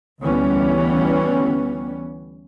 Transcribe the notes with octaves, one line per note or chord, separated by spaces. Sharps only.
D2 E3 G3 B3 C#4